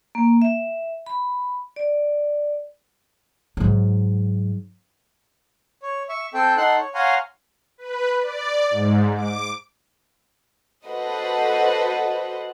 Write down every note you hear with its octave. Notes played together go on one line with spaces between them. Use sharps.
A#3
E5
B5
D5
G#2 F#3
C#5
E5 C#6
C4 A4 G5
D#4 A4 F#5 C6 F#6
C#5
C#5 F5 F#5 G#5 A#5 C6
B4
D5
G#2
D6
F#4 A4 B4 C5 D#5 F#5